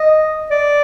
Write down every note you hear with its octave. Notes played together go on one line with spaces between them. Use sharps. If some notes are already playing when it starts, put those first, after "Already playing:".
Already playing: D#5
D5